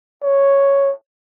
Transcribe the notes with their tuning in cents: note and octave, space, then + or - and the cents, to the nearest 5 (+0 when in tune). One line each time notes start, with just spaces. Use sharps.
C#5 +0